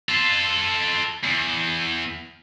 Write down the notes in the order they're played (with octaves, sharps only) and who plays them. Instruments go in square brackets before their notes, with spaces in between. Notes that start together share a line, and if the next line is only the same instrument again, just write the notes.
[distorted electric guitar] F4 A4
E2